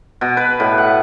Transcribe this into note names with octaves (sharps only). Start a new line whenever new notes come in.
B2
B4
A2
F#5